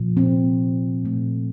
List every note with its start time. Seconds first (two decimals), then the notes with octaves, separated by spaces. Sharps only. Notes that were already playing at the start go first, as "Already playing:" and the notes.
Already playing: A#2 F3
0.17 C4
1.05 A#2 A3